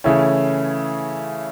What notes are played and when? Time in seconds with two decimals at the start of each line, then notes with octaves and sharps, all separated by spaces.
0.04 C#3 E3 A3 C#4 E4